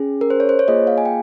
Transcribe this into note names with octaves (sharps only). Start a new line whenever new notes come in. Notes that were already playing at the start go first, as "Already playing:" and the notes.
Already playing: C#4 G#4
A#4
C5
C#5
C5
C#5
A#3 F4 G#4 D#5
F5
G#5
G5